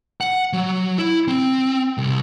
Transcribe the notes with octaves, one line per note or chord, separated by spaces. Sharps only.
F#5
F#3
E4
C4
C2